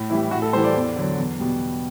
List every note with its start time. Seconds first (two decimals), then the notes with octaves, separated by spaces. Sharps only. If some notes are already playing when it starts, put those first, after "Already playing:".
Already playing: A2
0.10 E3 G3 E4
0.31 A2 F#4
0.42 A4
0.53 E3 G3 C5
0.64 D5
0.75 E2
0.97 D3 F#3
1.18 E2
1.39 B2 G3